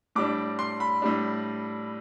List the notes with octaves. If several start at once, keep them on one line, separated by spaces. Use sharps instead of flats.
A2 G3 D4 D6
C6
B5
A2 G3 D4